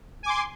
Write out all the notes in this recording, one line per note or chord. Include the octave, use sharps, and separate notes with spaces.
G#5 C6 D6